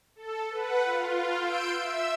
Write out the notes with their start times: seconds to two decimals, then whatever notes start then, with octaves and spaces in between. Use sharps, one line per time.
0.16 A4
0.50 B4 F#5
0.84 F4
1.38 C6 E6 G6 D7
1.81 E5 E6